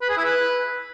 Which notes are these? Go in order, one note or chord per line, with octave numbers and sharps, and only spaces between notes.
B4
G#4
E4
B4